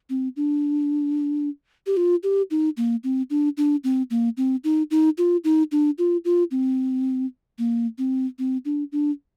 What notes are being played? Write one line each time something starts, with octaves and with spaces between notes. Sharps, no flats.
C4
D4
G4
F4
G4
D#4
A#3
C4
D4
D4
C4
A#3
C4
D#4
D#4
F4
D#4
D4
F4
F4
C4
A#3
C4
C4
D4
D4